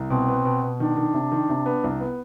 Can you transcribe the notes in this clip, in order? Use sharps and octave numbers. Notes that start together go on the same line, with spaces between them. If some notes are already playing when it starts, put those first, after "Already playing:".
Already playing: C2
B2 C4
B3
B2
B2
D#3 D4
D#3
C3
D#3
C3
B3
C2
B3